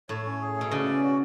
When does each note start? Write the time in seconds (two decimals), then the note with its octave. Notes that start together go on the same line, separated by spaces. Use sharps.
0.09 A2 C#5
0.26 C#4
0.41 G#4
0.56 B2 A3
0.71 C#3 D5
0.87 C#4
1.04 F#4